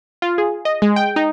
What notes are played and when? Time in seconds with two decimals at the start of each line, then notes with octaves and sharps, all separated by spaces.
0.22 F4
0.38 G#4
0.65 D#5
0.82 G#3
0.96 G5
1.16 D#4